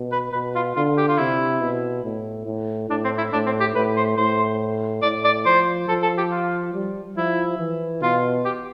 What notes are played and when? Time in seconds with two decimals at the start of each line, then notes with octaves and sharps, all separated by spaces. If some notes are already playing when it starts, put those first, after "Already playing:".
Already playing: B2
0.12 B4
0.33 B2 B4
0.55 F4
0.76 D3 F4
0.97 G4
1.08 F4
1.18 C3 E4
1.61 B2
2.04 A2
2.46 A2
2.89 A2 D4
3.04 C4
3.18 E4
3.33 A2 D4
3.46 C4
3.60 G4
3.75 A2 B4
3.97 C5
4.17 A2 C5
5.03 A2 D5
5.24 D5
5.46 F3 C5
5.89 F3 A4
6.03 A4
6.18 G4
6.31 F4
6.74 G3
7.16 F3 E4
7.59 E3
8.02 B2 F4
8.45 G4